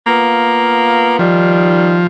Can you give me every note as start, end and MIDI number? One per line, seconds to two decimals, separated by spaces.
0.06 1.15 58
0.06 1.15 59
0.06 1.15 65
1.19 2.05 51
1.19 2.07 53
1.19 2.05 55
1.19 2.05 63